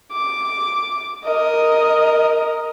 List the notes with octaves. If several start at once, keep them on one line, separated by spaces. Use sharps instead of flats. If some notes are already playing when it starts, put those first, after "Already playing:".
D6
A#4 D#5